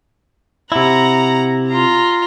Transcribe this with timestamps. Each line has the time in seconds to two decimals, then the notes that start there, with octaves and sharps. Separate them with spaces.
0.72 C3 E4 F#5 A#5
1.68 F4 A#5